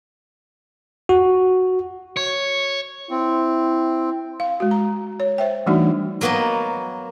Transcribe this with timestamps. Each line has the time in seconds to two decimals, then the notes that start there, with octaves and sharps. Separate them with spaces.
1.09 F#4
2.17 C#5
3.10 C4 E4
4.40 F5
4.60 G#3 F#4
4.71 A#5
5.20 C#5
5.38 C5 E5 G5
5.66 E3 G3 A3 D4 D#4 F#4
6.21 F#3 A#3 B3 F#4 D#5